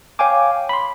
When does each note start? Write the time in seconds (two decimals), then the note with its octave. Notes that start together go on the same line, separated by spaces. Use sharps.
0.19 C#5 F5 G5 G#5 D6
0.69 B5 C6